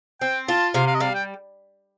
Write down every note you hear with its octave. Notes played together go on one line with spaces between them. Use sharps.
C4 G5
F4 A5
C3 F5
F5
D#5
G3 F5
G5